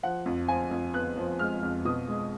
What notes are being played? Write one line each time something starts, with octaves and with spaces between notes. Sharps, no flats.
F3 F#5
F2
F3 G#5
F2
B3 F#6
F3
G#3 F6
F2
B2 D#6
G#3